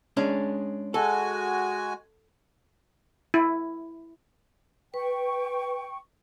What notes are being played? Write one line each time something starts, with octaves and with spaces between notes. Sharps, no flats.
G#3 C#4 D4
G#3 F#4 A4 G#5
E4
B4 G5 C#6